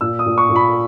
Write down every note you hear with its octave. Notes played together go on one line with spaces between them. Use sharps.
A#2 E6
D#6
A#2
C#6
A#2
B5